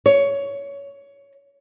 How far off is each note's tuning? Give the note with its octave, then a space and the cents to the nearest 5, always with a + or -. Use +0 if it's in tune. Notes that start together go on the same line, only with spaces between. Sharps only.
C#5 +15